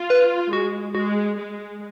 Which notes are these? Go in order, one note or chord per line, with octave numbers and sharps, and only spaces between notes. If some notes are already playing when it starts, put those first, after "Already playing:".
Already playing: F4
B4
G#3 F#4
G#3 F#4
G#3